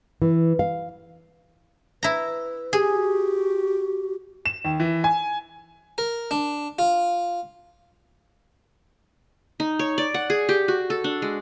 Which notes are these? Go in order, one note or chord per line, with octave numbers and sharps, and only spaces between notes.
E3
F5
E4 B4 A#5
G4 G#4
F#4
E7
D#2
E3
G#5
A#4
D4
F4
D#4
C#5
D5
F#5
G#4
G4
F#4
A4
D4
G#3